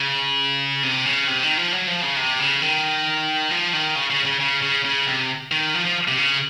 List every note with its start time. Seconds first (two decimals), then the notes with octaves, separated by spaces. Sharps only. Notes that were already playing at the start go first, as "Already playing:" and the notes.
Already playing: C#3
0.83 C3
1.06 C#3
1.27 C3
1.43 D#3
1.57 F3
1.73 F#3
1.87 F3
2.02 C#3
2.16 C3
2.39 C#3
2.62 D#3
3.51 F3
3.73 D#3
3.95 C#3
4.10 C#3
4.25 C#3
4.40 C#3
4.62 C#3
4.85 C#3
5.06 C3
5.52 D#3
5.74 F3
5.85 F3
6.08 C3
6.18 C#3